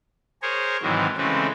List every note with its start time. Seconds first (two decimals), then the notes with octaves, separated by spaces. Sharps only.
0.42 G#4 A#4 C5 C#5
0.82 G#2 C3 D#3 E3 F#3
1.17 C#3 E3 G#3 A3 C4 C#4